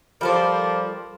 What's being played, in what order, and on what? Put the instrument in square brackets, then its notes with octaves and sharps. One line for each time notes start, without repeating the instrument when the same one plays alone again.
[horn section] F3 A#4 D5 [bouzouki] G3 A4 C5